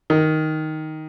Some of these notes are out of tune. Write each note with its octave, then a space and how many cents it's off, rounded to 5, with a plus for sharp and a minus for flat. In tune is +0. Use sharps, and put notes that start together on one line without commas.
D#3 +5